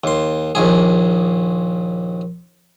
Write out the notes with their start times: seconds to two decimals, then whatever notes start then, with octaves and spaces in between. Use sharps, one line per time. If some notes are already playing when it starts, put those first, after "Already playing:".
0.04 D#2 C6
0.55 A#1 D#2 G#4